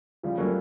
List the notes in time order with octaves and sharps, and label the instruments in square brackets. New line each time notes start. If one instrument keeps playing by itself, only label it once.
[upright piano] C#3 [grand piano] F3 G3
[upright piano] F#3 A#3 C#4 [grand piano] G3 A3